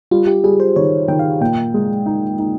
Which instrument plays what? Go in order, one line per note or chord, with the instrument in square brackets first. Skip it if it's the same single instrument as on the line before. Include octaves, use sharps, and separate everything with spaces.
[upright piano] G3 [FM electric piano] F4
[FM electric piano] G4
[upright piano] G3 [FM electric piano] G#4
[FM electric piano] C5
[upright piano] D#3 [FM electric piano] C#5
[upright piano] D#3 [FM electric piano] G5
[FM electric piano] F5
[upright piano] A#2 [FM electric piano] G5
[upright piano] G#3
D#4
D#4